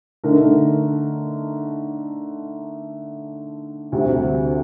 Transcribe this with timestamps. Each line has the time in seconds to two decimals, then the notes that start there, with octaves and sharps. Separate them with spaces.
0.24 D3 A3 D#4 A#4
3.92 D2 C3 G3